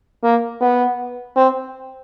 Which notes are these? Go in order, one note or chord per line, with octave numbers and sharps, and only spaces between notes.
A#3
B3
C4